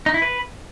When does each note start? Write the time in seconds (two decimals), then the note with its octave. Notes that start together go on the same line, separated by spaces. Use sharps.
0.06 D#4
0.14 E4
0.22 B4